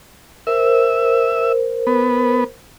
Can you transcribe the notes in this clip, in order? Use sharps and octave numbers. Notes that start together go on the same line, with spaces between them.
A#4 C5 E5
B3